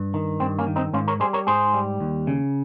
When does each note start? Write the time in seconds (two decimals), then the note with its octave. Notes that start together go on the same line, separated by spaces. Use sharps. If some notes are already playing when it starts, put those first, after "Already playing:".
Already playing: G2
0.14 D#3
0.40 G2 C4
0.59 A#3 C#4
0.67 D#3
0.76 C4 D#4
0.93 G#2 C#4 F4
1.08 A#4 C#5
1.20 G3 G#4 C5
1.33 A#4 C#5
1.47 G#2 G#4 C5
1.74 G3
2.00 D#2
2.27 C#3